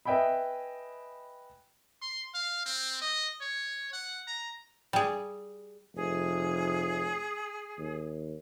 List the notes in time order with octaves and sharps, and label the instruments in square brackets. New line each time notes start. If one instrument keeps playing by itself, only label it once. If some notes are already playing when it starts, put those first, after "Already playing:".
[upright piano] B4 D#5 E5 G5 G#5 B5
[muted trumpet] C6
F5
C4
D#5
C#5
F#5
A#5
[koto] G3 G#4
[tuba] F1 [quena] G#4
[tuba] D#2